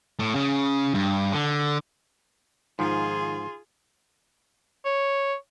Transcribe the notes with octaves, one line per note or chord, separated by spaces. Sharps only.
A2
C#3
G2
D3
G#2 D#3 F3 F4 G#4 C6
C#5